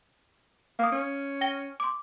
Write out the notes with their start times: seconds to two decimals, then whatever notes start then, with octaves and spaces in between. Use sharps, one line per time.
0.79 A#3 F5 D#6
0.92 C#4
1.41 G5 A#6 G7
1.80 C6 D6